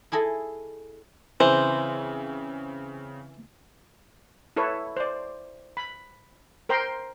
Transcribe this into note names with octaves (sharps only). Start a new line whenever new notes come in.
E4 G#4 A4 D#5
C#3 E3 C4 C5
E4 A4 B4 C#5
C5 D5
B5
A#4 C5 G5 A#5 C6